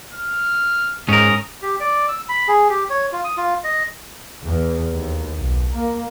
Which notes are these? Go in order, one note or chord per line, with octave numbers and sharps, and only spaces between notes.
F6
G#2 C#4 A#4 D#6
G4
D5
E6
B5
G#4
G4
C#5
F4
D#6
F4
D#5
E2
D#2
B1
A#3